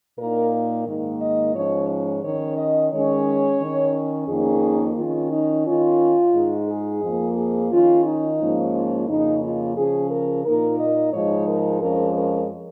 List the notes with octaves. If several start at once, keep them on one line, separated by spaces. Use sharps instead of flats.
A#2 A#3 D#4 A#4
A#4
G#2 D#3 A#3
D#5
G#2 F3 C#4 C#5
C#5
D#3 C#4 C#5
D#5
D#3 G#3 C#4 C#5
D#3 C#4
F2 D#3 A#3 C#4 G#4
D#3 C#4 F4
D#4
D#3 C#4 F4
G#2 G#3 D#4
G#4
F2 F3 A#3
G#4
D#3 C#4 F4
D#4
G#2 F3 A#3 C#4
F4
F2 C#3 A#3 D#4
F4
C#3 F3 C#4 G#4
A#4
A#2 A#3 D#4 A#4
D#5
G#2 F3 G#3 D#4 C#5
A#4
F2 F3 G#3 C#4 A#4
A#4